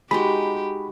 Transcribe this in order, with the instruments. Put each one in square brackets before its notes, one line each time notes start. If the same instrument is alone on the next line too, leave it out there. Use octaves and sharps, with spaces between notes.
[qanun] G#3 D#4 F#4 [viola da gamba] G4 [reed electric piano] B5